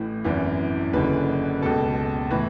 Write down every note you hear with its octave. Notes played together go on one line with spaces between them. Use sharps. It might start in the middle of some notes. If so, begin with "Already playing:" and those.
Already playing: A1 A2 E3
G#1 F#2 E3
F#1 F#2 D3 B4
C#2 B2 A4
A2 E3 B4